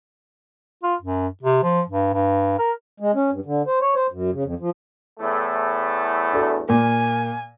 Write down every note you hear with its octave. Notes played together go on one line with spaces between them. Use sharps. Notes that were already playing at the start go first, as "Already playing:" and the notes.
F4
F#2
C3
F3
G2
G2
A#4
G#3
C#4
G2
D3
C5
C#5
C5
F#2
C#3
F2
F3
E2 A2 A3
D4 F#4 A4
A#2 A#3 G#5